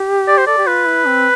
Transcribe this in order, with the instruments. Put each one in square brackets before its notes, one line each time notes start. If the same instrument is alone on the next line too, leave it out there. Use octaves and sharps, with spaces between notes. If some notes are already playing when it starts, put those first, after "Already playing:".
Already playing: [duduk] G4
[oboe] D5
C5
[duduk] A4 [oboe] D5
[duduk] G4
[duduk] F4 [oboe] B4
[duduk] E4
C4